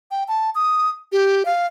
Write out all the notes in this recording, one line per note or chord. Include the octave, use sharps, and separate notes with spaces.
G5
A5
D#6
G4
F5